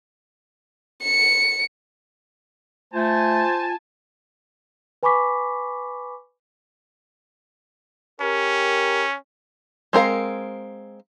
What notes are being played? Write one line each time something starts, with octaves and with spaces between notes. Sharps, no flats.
C#7
A3 F4 C5 G#5 A5
B4 G#5 B5 C#6 D6 B6
C#4 G4 A#4
G#3 C4 A#4 F5